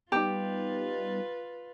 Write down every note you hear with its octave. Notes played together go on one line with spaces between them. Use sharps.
G3 B3 D#4 F4 G4 B4